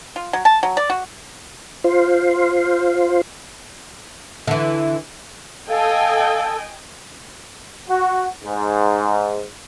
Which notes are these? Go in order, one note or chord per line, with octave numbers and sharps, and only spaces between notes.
F4
F#3
A5
F#3
D5
F#4
F4 C5
D3 E3
A4 D#5 F5 G5 G#5
F#4
G#2